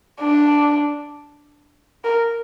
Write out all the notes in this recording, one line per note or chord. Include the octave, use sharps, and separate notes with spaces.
D4
A#4